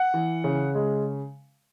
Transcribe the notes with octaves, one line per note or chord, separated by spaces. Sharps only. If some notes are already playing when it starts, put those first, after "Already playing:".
Already playing: F#5
E3
C#3
G#3